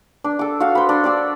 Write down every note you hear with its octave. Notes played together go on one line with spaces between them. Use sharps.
D4
A4 D6
F#4 F5
C5 B5
D4
D5 D6 E6